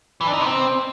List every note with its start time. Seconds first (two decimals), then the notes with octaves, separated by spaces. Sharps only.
0.21 E3
0.27 D4
0.33 D#4
0.40 C3
0.46 C4